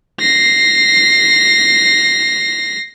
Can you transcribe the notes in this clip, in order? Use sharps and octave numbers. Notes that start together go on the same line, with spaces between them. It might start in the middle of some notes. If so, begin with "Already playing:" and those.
A#6 C7